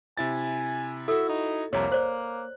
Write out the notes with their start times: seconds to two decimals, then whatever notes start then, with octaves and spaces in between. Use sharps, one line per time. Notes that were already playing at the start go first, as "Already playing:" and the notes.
0.17 C3 E4 G#5 A6
1.08 E4 F#4 A4 E5
1.29 D#4
1.73 C2 F2 C3 A#3 C#5 A#5
1.92 C5 D5 F#6